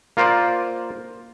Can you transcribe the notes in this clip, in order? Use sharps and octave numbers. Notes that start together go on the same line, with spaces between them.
A#3 F4 A#4 C5 D5